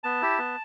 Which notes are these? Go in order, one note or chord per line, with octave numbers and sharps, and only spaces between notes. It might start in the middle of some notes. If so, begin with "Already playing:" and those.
B3 A5
E4 G4
B3